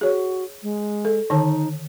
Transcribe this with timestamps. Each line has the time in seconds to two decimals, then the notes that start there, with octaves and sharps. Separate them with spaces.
0.01 F#4 G#4 C#5
0.63 G#3
1.05 A4
1.30 D3 D#3 D#4 A5